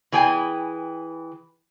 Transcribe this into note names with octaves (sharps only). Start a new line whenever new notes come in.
E3 G#4 G5 G#5